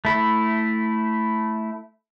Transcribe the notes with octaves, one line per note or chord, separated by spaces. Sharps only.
A3 E4